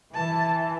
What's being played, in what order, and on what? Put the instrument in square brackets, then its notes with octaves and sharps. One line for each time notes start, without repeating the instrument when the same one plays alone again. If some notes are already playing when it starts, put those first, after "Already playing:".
[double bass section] E3 [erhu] A5